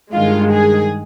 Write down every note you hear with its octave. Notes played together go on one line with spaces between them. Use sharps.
G2 D#3 G#3 F4
G#4